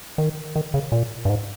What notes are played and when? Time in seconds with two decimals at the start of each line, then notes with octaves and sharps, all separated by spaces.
0.18 D#3
0.56 D#3
0.74 C#3
0.92 A#2
1.25 G2
1.30 G#2